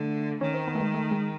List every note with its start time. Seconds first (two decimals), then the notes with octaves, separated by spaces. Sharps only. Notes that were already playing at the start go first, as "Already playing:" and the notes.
Already playing: D3 A3
0.41 D#3 C#4
0.54 C4
0.68 B3
0.75 A3
0.80 G#3
0.94 A3
1.11 G#3